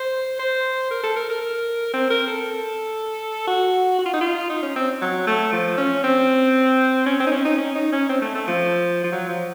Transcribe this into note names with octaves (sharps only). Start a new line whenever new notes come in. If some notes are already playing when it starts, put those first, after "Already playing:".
Already playing: C5
C5
A#4
A4
A#4
A#4
C4
A#4
A4
F#4
F#4
F4
D#4
F4
D#4
C#4
C4
F#3
A3
F3
C#4
C4
C#4
C4
D#4
C#4
D#4
C#4
D#4
C#4
C4
A3
A3
F3
F3
F#3
F3